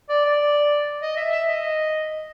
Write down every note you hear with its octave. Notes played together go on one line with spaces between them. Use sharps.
D5
D5
D#5
E5
E5
D#5